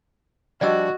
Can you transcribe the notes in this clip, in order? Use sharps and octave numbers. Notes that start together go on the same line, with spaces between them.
F3 G3 D4 F#4 D5 D#5 E6